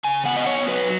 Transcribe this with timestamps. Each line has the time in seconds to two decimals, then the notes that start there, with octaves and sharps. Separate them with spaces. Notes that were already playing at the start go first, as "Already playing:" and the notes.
0.04 C#3 G#5
0.25 B3 F#5
0.36 D#5
0.47 B3 C#5
0.67 F#3 B4